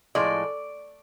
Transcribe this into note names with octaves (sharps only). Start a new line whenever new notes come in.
A2 F3 G#3 D5